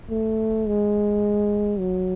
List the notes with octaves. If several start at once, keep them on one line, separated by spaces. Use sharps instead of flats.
A3
G#3
F#3